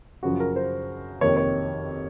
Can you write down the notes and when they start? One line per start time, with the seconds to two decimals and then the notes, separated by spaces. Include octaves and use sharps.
0.23 F#2 C#3 F3 F#4
0.40 A#4
0.56 C5
1.21 F2 C3 D#3 A#3 C#5
1.37 C#5